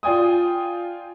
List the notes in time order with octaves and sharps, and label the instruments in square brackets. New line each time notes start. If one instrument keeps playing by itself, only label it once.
[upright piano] F4 D5 G5 G#5 D#6